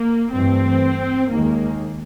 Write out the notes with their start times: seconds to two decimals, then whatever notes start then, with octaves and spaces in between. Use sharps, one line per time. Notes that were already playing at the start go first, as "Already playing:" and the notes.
Already playing: A#3
0.33 G2 E3 A3 C4
1.31 D#2 D#3 G#3 A#3